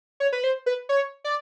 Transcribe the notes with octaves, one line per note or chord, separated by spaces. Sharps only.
C#5
B4
C5
B4
C#5
D5